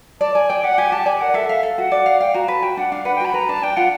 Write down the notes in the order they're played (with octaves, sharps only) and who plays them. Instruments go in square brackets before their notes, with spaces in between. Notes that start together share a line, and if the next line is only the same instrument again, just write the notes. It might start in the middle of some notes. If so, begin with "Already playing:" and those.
[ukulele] D5 [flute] A5
[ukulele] D5 [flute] G#5
[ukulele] D5 [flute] G5
[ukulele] G4 [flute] F#5
[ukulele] G4 [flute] G#5
[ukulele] G4 [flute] A5
[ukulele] D5 [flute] G#5
[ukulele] A#4 [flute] F#5
[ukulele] A4 [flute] E5
[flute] E5 [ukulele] F5
[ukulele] A4
[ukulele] F#4 [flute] F#5
[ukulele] D5
F5
[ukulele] F5 [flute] G5
[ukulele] F#4 [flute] A#5
[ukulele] B4 [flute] A5
[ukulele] F#4 [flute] G5
[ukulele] D4 [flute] F#5
[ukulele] D4 [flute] F5
[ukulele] B4 [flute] F#5
[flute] G5
[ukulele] F#4 [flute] B5
[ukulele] B4 [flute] A#5
[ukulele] D4 [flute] A5
[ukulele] D4 [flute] G5
[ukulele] F4 [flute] F#5